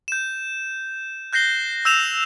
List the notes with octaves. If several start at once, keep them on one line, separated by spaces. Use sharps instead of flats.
G6 E7
F#6 G6 A#6 C7 G7
E6 G6 E7 F7